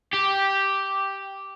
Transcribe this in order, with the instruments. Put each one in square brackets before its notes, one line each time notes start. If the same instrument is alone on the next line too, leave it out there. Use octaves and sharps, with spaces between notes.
[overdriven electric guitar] G4